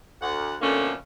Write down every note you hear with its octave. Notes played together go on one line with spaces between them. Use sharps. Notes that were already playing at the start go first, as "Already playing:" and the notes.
D2 F#5
F2 B2 D3 A3 A#3 C#4